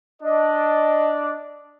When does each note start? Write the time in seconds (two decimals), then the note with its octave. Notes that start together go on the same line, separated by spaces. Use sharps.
0.22 D4 D5 D#5